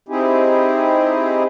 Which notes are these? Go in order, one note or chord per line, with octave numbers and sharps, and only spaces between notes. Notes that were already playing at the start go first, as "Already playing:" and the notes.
C4 D#4 E4 G4 G#4